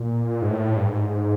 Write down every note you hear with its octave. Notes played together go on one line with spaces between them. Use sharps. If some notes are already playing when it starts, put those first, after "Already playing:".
Already playing: A#2
G#2
A2
G2
G#2